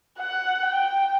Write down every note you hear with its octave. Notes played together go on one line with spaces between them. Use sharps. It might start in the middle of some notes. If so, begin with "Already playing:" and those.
F#5
G5